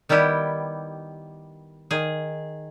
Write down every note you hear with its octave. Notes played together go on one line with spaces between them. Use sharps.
D#3 G3 B3 E4 G4
D#3 G#4